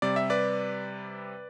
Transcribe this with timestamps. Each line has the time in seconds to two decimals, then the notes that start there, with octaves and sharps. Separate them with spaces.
0.02 C3 G3 D5
0.16 E5
0.30 B4 D5